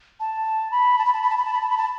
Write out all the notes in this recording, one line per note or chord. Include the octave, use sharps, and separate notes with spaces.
A5
B5
A5
B5
A5
B5
A5
B5
A5
B5
A5
B5
A5